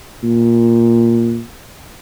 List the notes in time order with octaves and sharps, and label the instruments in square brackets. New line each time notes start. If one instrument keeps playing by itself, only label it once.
[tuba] A#2